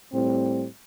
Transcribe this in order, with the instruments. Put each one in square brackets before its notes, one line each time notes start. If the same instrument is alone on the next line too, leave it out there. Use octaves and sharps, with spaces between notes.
[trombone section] A2 G3 C4